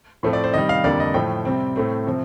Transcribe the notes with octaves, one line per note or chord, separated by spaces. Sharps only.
A2 F3 A3 C4
D5
C5
C3 D#3 G3 D#5
F5
F2 D3 G3 A#3 D5
D#5
A2 F3 A3 G5
C3 G3 C4
A2 A3 C4
C3 F3 C4